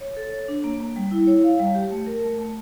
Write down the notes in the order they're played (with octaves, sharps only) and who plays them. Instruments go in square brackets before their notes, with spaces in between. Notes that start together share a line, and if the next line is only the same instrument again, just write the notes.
[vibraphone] C#5
A4
C#5
D4
A#3
A#3
G3
E4
C#5
F5
G3
G4
A3
A#4
A3
A3